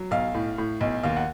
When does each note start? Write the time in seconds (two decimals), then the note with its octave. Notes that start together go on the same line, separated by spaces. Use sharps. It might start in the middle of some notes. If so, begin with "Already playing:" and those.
Already playing: F#3
0.11 B1 F5
0.34 A2
0.58 A2
0.81 B1
1.03 D#2 F5
1.17 F#5